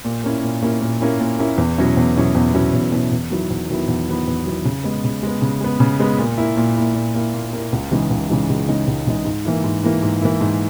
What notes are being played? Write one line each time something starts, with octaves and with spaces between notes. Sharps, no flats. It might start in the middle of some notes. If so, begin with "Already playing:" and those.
A#2
A#3 C#4 E4
A#2
A#3 C#4 E4
A#2
A#3 C#4 E4
A#2
A#3 C#4 E4
E2
B2 F#3 C#4 E4
E2
B2 F#3 C#4 E4
E2
B2 F#3 C#4 E4
E2
B2 F#3 C#4 E4
E2
D#3 F#3 B3 E4
E2
D#3 F#3 B3 E4
E2
D#3 F#3 B3 E4
E2
D#3 F#3 B3 E4
C#3
G#3 B3
C#3
G#3 B3
C#3
G#3 B3
C#3
G#3 B3
A#2
A#3 E4
A#2
A#3 E4
A#2
A#3 E4
A#2
A#3 E4
C#2
C#3 E3 G#3 D#4
C#2
C#3 E3 G#3 D#4
C#2
C#3 E3 G#3 D#4
C#2
C#3 E3 G#3 D#4
G#2
E3 A#3 E4
G#2
E3 A#3 E4
G#2
E3 A#3 E4
G#2